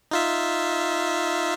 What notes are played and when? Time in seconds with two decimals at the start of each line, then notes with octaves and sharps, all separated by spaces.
0.11 D#4 F4 E5